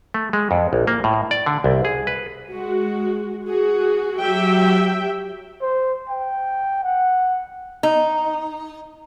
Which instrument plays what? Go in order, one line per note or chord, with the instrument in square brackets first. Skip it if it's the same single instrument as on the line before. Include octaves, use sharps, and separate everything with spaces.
[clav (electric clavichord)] A3
G#3
F2
A#1
A#3
A2
D5
D3
C2
G#4
B4
[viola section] G#3 F#4
F#4 G#4
F#3 G4 E5 G5
[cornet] C5
G5
F#5
[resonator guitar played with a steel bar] D#4